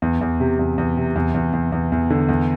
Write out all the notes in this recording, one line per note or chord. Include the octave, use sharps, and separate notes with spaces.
E2
E2
C3
E2
E2
C3
E2
E2
E2
E2
E2
D3
E2